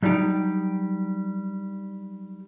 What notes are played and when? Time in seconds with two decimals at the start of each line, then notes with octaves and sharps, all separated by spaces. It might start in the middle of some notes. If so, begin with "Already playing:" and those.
0.02 F#3 G3 D4 D#4 G4